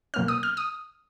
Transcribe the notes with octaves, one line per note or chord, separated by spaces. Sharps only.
B2 F#3 A#3 C#4 F6
D#6
F6
D#6